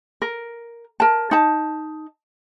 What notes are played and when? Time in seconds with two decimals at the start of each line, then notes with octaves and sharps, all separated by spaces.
0.22 A#4
1.00 A#4 A5
1.31 D#4 A5